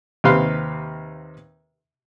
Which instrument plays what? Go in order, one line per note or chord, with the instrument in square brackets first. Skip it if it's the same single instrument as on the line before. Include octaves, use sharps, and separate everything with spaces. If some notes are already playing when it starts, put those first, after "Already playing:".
[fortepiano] D#2 C3 C4 B4 F5 C6